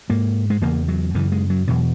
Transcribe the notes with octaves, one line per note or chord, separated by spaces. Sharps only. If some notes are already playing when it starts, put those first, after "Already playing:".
G#2 A#3
G#3
E2 C#3 A#3
F#3
F#2 C#3 E3
G#3
F#3
E2 B2 F#3